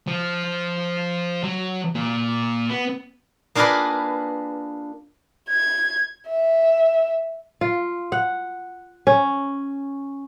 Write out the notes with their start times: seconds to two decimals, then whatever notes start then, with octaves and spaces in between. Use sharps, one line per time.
0.07 F3
1.43 F#3
1.95 A#2
2.69 B3
3.55 A#3 D4 F4 G#4 A#4 B4
5.50 G#6
6.30 E5
7.61 F4
8.12 F#5
9.07 C#4